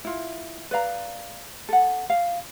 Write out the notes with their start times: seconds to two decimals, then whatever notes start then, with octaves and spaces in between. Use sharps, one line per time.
0.05 E4 F4
0.71 B4 D5 F5 A#5
1.69 A4 F#5
2.10 F5